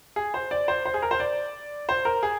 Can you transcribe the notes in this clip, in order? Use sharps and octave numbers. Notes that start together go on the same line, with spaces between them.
G#4
C5
D5
C5
C5
G#4
A#4
C5
D5
C5
A#4
G#4